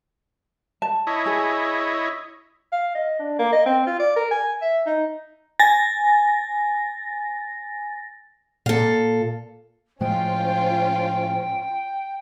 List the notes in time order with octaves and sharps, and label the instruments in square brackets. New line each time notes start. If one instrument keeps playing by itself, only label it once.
[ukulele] A5
[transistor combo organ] E4 C#5 D#5
[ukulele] G#4
[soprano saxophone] F5
D#5
D4
A#3
D#5
C4
F4
D5
A#4
G#5
E5
D#4
[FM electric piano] G#5 A6 A#6
[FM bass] A#2 [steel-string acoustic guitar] A4 F5
[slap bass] A2 F3 G#3 [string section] C#4 F4 [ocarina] C5 [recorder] G5